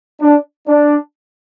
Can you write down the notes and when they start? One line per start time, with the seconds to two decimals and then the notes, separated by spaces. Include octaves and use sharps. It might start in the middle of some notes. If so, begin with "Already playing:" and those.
0.21 D4
0.67 D4